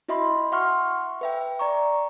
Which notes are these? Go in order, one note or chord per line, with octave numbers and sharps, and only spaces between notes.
E4 F#4 D#5 E5 B5 C6
E5 F#5 C6 C#6 F6
B4 E5 G5
D5 A#5 C#6